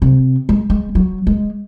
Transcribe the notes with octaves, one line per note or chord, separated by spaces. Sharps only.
C3
G#3
G#3
F#3
G#3